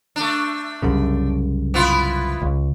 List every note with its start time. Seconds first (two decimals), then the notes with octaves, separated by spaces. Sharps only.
0.16 A3 D4
0.82 C2 F#2 C#3
1.74 B3 E4 F4
2.42 C#2